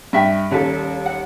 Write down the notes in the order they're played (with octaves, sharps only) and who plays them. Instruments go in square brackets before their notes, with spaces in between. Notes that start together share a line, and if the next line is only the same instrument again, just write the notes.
[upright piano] G2 [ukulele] D#5 E5 G5
[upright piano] D#1 D#2 [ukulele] C#4 A4
[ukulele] F#5